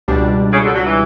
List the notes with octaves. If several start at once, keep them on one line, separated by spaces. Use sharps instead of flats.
C#2 B2 G3 D4
C#3
D3
F#3
E3